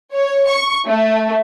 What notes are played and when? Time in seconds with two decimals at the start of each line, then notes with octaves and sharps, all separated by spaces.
0.12 C#5
0.48 C#6
0.86 A3